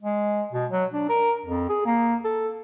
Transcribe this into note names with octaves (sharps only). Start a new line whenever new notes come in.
G#3
B2
F#3
D4
A#4
F2
G#4
A#3
A4